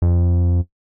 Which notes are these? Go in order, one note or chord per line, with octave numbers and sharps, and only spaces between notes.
F2